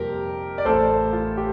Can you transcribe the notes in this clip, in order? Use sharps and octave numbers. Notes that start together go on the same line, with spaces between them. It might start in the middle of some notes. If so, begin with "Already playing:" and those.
Already playing: F2 C3 G3 A#3 G4 A#4
D5
A1 A2 A3 A4 C5
F4
G4